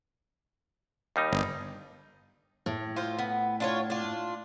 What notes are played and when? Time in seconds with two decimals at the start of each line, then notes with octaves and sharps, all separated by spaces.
1.16 D#2 G3 D#4
1.32 G1
2.66 A2
2.96 F4 C5
3.18 B3
3.60 D4 F4 C#5
3.90 D4 F4